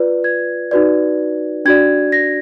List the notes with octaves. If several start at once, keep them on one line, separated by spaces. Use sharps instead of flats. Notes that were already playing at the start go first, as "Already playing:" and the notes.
Already playing: F4 B4 D5
G#6
D#4 F#4 B4 D5
D4 F#4 D5 G#6
A#6